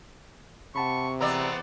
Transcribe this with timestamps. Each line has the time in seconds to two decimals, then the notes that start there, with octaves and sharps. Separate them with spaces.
0.76 C3 F#5 A5 B5 C#6
1.21 E2 B3 C4 D5 A#5 E6